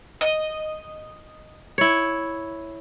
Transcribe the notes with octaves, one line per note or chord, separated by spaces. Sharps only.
D#5
E4 C#5